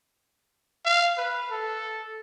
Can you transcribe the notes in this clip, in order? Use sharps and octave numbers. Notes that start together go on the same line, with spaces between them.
F5
B4
A4